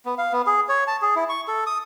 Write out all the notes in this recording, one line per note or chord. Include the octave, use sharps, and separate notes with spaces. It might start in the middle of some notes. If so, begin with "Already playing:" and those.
B3
F5
B3
G#4
C#5
A5
G#4
E4
C#6
A4
D#6